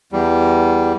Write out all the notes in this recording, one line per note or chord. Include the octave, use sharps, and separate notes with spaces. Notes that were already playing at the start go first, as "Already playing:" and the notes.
E2 G3